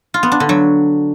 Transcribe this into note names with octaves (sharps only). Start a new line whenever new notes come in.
F4
B3
D4
D3
F#3